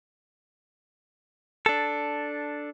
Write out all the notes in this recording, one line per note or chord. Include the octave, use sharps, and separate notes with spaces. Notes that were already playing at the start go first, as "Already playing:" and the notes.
D4 A4